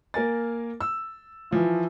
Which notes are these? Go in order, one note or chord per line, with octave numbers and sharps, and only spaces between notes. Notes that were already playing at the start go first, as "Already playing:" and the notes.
A#3 A#4 G#5 A6
E6
E3 F3 F4